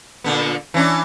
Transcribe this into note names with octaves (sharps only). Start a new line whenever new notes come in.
A#2 D3 B3
E3 C#4 D4